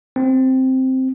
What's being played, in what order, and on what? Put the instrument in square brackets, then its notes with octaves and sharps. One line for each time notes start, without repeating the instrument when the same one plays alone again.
[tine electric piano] C4